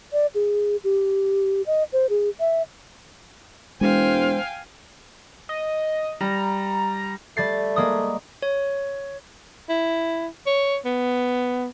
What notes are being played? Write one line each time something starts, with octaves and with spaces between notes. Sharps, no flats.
D5
G#4
G4
D#5
C5
G#4
E5
E1 G#3 C5 F5 G5 G#5
D#5
G3 A#5
G3 A3 A6 C7
G#3 A#3 D#6
C#5
E4
C#5
B3